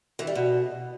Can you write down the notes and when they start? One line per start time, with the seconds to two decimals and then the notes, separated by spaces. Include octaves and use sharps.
0.19 E3
0.27 G3
0.35 B2